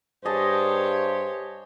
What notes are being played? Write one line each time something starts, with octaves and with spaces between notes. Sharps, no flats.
G2 G4 G#4 C5 C#5 D#5 A5